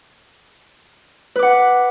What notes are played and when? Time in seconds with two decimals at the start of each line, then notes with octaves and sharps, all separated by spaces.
1.36 B4
1.39 D6
1.43 F#5